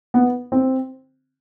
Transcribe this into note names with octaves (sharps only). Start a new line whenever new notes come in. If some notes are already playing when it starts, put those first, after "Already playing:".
B3
C4